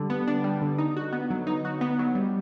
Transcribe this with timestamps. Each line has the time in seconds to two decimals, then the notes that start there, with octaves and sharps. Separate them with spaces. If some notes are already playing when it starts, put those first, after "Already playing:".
Already playing: D3 G3 D4
0.10 B3
0.27 D4
0.44 G3
0.61 D3
0.78 D#4
0.97 F#4
1.12 B3
1.30 F#3
1.47 D#4
1.65 F#4
1.81 B3
1.99 F#3
2.15 G3